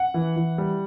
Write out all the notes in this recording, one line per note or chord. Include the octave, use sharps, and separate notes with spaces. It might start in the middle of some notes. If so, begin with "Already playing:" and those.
Already playing: F#5
E3
E3
G3